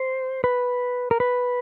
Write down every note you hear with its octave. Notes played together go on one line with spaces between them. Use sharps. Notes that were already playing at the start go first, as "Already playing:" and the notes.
Already playing: C5
B4
A#4
B4